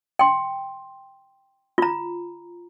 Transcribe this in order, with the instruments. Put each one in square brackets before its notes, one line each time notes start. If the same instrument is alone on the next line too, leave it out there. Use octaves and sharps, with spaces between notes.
[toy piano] G5 C6
F4 A#5